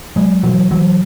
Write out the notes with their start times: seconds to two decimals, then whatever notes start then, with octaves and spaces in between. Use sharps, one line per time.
0.16 F#3 G#3
0.43 B2 E3 F#3
0.71 E3 F#3